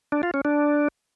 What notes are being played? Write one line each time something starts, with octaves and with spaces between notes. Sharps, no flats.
D4
F4
C#4
D4